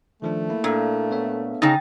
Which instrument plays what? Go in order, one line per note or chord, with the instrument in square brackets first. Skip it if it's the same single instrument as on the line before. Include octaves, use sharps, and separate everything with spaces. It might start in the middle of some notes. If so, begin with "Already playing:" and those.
[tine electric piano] D#3 F3 D4 [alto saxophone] A3
[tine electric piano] A#3 E4
[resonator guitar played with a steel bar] A#2 [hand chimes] D4 A4 F5
[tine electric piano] B3 C#5 E5
[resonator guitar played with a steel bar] C#3 D#4 [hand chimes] G5 A6